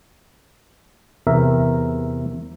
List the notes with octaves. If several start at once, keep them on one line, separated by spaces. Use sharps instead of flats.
E2 C3 A#4 E5